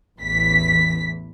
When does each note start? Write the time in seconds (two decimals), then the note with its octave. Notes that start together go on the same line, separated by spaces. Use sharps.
0.19 A1 E2 E3 B6